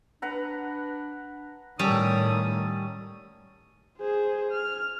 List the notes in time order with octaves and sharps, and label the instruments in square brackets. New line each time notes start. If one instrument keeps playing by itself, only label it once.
[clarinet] D4 [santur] B4 F#5 A#5
[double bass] A2 D#3 [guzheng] G3 [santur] C#4 A4 [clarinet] D#6
[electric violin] G#4 C5
F6